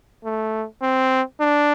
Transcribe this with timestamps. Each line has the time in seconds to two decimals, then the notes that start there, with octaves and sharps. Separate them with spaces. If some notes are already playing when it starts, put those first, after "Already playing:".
0.25 A3
0.82 C4
1.40 D4